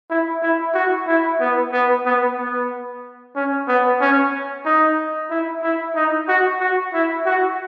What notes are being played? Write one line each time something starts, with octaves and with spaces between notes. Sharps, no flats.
E4
E4
F#4
E4
B3
B3
B3
B3
C#4
B3
C#4
D#4
E4
E4
D#4
F#4
F#4
E4
F#4